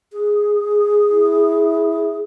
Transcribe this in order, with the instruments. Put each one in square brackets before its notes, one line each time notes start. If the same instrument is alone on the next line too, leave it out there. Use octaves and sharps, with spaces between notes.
[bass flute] G#4
[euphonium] E4